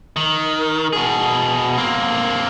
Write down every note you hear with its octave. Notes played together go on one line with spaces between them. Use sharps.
D#3
B2 G#4
A#3 C4